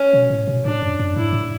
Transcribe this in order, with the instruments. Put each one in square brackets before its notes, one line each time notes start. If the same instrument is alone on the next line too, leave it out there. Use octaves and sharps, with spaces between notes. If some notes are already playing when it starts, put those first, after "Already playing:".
Already playing: [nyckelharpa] C#4
[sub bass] B2
A2
B2
[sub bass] A2 [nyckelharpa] D4
[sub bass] F#2
F#2
[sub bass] G#2 [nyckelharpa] E4
[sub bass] A2